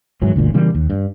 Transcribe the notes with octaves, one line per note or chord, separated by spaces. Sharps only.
G#2 D#3 E3 F#3
G1 D2 A#2
C#3 E3 G3 A#3
D#2
G2